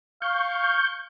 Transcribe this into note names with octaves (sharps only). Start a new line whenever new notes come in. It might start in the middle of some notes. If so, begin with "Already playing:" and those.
F5 C#6 G6